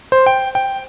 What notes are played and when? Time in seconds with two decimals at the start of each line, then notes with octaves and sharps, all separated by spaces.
0.12 C5
0.26 G5
0.55 G5